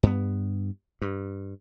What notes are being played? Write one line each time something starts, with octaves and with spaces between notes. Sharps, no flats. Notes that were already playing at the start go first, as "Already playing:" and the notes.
G2 B3
G2